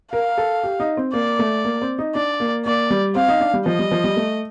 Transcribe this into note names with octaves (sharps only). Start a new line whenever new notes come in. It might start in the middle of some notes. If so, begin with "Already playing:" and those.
A#4 F5
A4
G4
D#4
C4
A#3 D5
A3
A#3
C4
D#4
D4 D5
A#3
A#3 D5
G3
C4 F5
D#4
D4
G3
F3 D#5
G3
F3
G3
A3